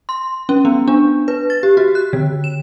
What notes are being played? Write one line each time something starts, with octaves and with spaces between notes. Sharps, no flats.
C6
C#4
B3
D4
B4
A6
G4
F#4
F#6
D3
E7